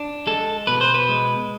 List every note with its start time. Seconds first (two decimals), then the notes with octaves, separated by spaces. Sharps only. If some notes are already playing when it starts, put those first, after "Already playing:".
Already playing: D4
0.27 G#3 A4
0.67 B2 B4
0.81 C5
0.94 B4
1.09 G#3